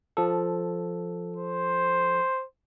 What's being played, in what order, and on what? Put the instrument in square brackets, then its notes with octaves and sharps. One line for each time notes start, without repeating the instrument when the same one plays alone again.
[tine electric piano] F3 A4
[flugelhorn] C5